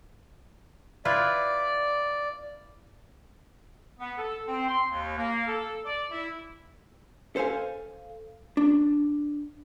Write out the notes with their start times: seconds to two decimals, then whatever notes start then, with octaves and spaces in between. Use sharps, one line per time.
1.05 E4 F4 B4 D5
4.00 B3
4.18 A4
4.47 C4
4.69 C6
4.88 D#2
5.17 A#3
5.47 A4
5.85 D5
6.11 E4
7.36 A4 C5 F5 G#5
8.57 D4